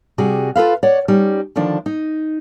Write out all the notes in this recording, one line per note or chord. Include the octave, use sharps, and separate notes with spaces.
C3 G3 F#4 G#4
F4 A4 B4 F5
C#5 D5 F#5
G3 C#4 D#4
D3 D#3 F3 D4
D#4